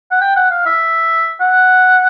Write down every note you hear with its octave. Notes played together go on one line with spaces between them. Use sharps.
F#5
G5
F#5
F5
E5
F#5